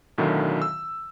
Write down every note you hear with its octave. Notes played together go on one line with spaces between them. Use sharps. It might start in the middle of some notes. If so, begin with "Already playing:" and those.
B1 A2 D3 D#3 F#3
E6